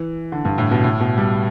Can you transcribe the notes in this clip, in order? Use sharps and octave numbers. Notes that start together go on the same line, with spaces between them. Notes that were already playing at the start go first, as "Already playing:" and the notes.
Already playing: E3
D3
G2
A2
B2
A2
B2
G3